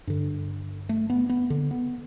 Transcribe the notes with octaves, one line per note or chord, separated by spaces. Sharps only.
G2 D3
A3
B3
B3
D3
B3